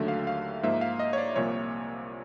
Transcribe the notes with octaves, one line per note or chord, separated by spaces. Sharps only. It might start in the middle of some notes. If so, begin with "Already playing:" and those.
Already playing: D#2 D3 F#3 A3 E5
F5
F5
G#2 F3 A#3 E5
F5
D#5
C#5
D5
C2 A#2 F3 A#3 C#5